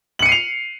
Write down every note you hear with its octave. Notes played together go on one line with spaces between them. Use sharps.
C7 C#7 D#7 F7 F#7